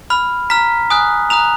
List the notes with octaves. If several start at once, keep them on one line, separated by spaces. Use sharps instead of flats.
B5 F6
A#5 F6 B6
G#5 D#6 F#6
A#5 D#6 F#6 F7